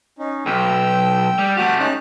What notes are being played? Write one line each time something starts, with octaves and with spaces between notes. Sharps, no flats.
C#4 D#4
B1 G5 E6
G3
A3 F#4 G4 F#5 F#6
C#4 D#4 F#6